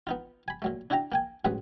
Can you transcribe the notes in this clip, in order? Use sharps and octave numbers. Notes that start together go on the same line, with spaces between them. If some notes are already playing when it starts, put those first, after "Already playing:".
B3 D#4 F4
G#5 B5
A#2 F#3 A3
D4 E4 F#4 G5 A5 A#5
A#3 G5 G#5
A1 G#2 F#3 G#3 B4 D#6